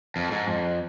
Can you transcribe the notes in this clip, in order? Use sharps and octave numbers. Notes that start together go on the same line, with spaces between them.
F2
G#2
F2